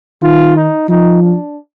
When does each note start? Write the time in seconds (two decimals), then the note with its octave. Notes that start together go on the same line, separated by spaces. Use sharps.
0.22 D#3 F4
0.56 D#4
0.89 F3 D#4
1.23 D4